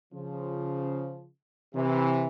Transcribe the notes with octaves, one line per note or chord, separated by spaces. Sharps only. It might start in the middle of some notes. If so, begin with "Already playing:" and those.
C#3 F3
C3 E3